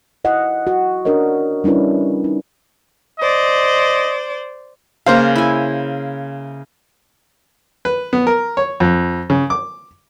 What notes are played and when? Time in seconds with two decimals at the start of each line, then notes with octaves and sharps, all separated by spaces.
0.24 E4 D#5 F#5
0.67 F#4
1.05 C#4 D4 F#4 A#4 C#5 D#5
1.64 G3 C#4 D4 E4 B4
2.24 D#4
3.20 C5 D5 D#5
5.06 C#3 A#3 C5 F5 A#5
5.36 E4 G#5
7.85 B4
8.13 B3
8.27 A#4
8.57 C#5
8.80 F2
9.30 C#3
9.50 D6